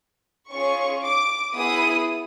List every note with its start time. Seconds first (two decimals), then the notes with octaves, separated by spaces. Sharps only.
0.51 C#4 F4 G#4 C#6
1.03 D6
1.55 B3 E4 G#4 D#6